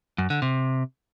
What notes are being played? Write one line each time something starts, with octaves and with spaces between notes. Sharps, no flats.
F#2
D3
C3